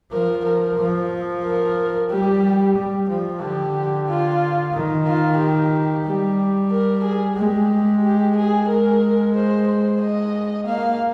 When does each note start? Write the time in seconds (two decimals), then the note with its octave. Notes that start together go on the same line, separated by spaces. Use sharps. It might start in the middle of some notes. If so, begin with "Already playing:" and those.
0.13 F3 A#4
0.45 A#4
0.79 F3
1.44 A#4
2.11 G3 G4
2.76 G3
3.09 F3
3.42 D3 G4
4.08 F4
4.74 D#3
5.07 F4
5.40 G4
6.06 G3
6.71 A#4
7.05 G#4
7.37 G#3 G4
8.04 G4
8.36 G#4
8.69 G#3 A#4
9.35 C5
9.68 C5
10.02 D#5
10.67 A#3 F5